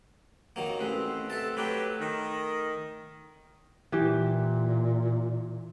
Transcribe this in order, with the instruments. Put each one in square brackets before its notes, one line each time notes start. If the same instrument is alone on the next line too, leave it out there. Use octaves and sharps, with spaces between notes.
[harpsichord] D#3 F#3 A#3
[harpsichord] A1 G#3 [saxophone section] B3 C4
[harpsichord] A4 E5 A5
[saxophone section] F#3 G4 B4 [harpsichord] A3
[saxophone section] D#3
[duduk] A#2 [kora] E3 G4